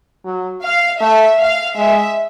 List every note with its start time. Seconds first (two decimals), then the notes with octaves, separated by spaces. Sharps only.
0.25 F#3
0.63 F5
1.00 A3 E5
1.39 F5
1.76 G#3 E5